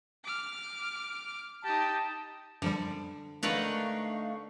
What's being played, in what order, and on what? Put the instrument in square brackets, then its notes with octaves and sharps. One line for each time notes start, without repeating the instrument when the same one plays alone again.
[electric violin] D6 F6
[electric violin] D#4 G4 [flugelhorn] A5
[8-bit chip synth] F#2 F3 G3 [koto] D3
[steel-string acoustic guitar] A3 D4 D#4 [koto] A#4 B4 F#5 [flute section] F5 C#6